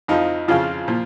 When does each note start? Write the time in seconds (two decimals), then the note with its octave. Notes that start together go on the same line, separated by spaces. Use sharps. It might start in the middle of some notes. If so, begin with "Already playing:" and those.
0.08 F2 F3 D#4
0.48 F2 C#3 F3 F4
0.88 A#2 F3